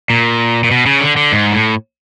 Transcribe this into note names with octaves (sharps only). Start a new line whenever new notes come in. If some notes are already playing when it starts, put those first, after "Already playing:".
A#2
A#2
B2
C#3
D3
D3
G#2
A2